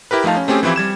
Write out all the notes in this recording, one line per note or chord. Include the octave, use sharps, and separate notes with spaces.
E4 G4 A#4 B4
F3 A3 D#4 F5 A5
C#4
A3 C4 C#4 G4 G#4
E3 F3 C4 E4 G4
G3 G#6 E7